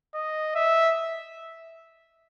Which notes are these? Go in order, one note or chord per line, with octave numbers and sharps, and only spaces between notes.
D#5
E5